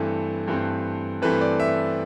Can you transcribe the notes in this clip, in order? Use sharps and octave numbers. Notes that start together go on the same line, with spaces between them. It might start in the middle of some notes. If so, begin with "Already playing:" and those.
Already playing: G2 E3 A3 C4
G2 E3 A3 C4
G2 E3 A3 C4 B4
D5
E5